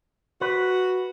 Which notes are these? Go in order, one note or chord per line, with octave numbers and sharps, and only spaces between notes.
F#4 B4